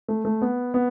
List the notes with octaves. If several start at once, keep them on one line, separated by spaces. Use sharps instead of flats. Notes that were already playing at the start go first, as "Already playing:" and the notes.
A3
A3
B3
B3